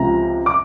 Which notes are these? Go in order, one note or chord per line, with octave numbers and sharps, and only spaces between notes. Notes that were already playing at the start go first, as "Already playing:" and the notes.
Already playing: C#2 C3 F3 A#5
D6